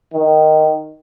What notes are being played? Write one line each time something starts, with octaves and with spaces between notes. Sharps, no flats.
D#3